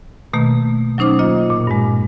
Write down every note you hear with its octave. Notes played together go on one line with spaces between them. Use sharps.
B2 D#3 A3 A#3
F#3 C#4 D#4 C5 D6 F6
A#3 F4 D#5
A#2
G2 G#3